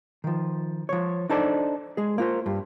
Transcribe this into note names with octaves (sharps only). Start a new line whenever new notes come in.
D#3 F3
F3 C#5
D4 D#4 A4 C5 D5
G#3 G#4
A#3 F4 C5
G2